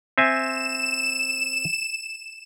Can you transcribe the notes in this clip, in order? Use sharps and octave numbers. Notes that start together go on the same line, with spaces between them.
C4 E5 G#5 E7